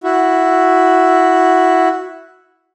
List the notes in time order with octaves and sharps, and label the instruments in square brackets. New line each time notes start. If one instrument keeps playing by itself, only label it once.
[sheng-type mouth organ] E4 F#4